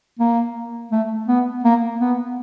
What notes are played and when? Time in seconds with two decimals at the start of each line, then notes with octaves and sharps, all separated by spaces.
0.19 A#3
0.91 A3
1.28 B3
1.64 A#3
2.01 B3